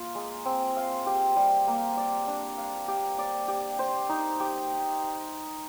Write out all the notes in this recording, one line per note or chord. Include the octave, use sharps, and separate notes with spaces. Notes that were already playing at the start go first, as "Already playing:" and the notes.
Already playing: A#3 F4
G#3
C4
F5
G4
G3
A#3
D5
D4
F5
G4
D5
G4
C5
D#4
G4